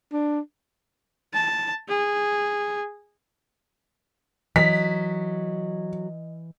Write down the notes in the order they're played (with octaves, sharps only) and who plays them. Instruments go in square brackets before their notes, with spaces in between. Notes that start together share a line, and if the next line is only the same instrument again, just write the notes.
[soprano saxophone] D4
[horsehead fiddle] A5
G#4
[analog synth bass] E3 [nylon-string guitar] F#3 [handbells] D#5 [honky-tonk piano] B6